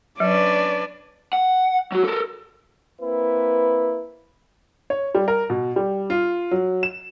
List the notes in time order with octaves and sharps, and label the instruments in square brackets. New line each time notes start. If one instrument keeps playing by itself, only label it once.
[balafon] F#3 [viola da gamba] C#4 D4 B4 [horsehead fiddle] D5
[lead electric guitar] F#5
F#3 F#4
A4 A#4
[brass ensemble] A#3 C4 E4 B4
[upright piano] C#5
G3
A#4
B2
G3
F4
F#3
E7